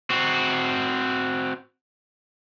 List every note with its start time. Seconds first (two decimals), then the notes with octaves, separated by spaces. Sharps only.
0.10 C4 F#4